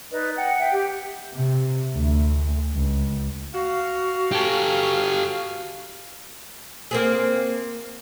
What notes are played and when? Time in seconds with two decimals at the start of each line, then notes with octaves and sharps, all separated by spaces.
0.11 D#4 B4 D5 D#5
0.35 D#5 F#5 G5
0.56 E5 G5
0.71 G4
1.35 C3
1.96 D2
2.75 C#2
3.54 F#4 F5
4.32 G4 A4
6.91 A#3 C4 G#4